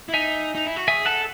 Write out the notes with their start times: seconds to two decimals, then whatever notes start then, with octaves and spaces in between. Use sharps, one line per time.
0.09 E4
0.13 D#4 E5 G#5
0.55 D#4
0.65 E4
0.76 F#4
0.87 G#4 E5 G#5
1.05 A4 F#5 A5